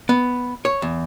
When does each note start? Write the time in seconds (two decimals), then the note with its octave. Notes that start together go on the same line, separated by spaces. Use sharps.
0.09 B3
0.65 C#5
0.82 E2